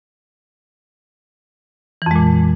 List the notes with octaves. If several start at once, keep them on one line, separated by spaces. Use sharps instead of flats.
F2 A#2 E3 G#3